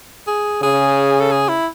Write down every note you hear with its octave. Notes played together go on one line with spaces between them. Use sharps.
G#4
C#3 G#4
A4
G#4
E4